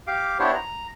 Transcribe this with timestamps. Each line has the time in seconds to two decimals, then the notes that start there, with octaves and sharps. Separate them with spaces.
0.07 G4 F5 D6
0.39 B3 D4 E4 G4 C5 C#5
0.54 A#5